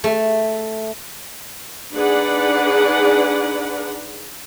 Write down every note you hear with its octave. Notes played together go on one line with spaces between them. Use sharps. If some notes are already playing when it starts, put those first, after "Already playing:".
A3
D4 D#4 G#4 B4 D5 F#5